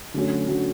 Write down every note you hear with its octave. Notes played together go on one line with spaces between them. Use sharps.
D3 F#3 A3 C#4 F#4
D3 F#3 A3 C#4 F#4